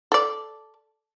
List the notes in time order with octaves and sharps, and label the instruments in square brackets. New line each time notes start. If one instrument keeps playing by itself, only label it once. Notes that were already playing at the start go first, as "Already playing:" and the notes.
[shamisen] A4 D5